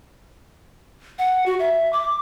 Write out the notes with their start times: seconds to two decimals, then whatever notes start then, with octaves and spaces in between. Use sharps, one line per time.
1.19 F#5
1.46 F#4
1.59 E5
1.93 D6